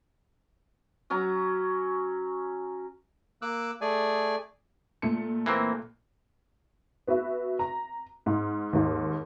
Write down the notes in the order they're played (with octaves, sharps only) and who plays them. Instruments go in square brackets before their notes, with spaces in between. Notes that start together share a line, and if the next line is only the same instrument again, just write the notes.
[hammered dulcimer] F#3 C#4 A#5
[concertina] A#3 D6 E6 F#6
A3 G#4 D5 G#5
[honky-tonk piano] A#2 A3 C#7
[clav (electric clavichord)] E3 A#3 C4
[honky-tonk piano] B3 F#4 B4 E5
A#5
G#2
D#2 G#2